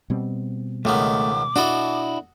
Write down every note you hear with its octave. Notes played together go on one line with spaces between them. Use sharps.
B2 G3 C4
C#2 D#3 A3 B3 D6
D4 E4 F#4 A4 D#5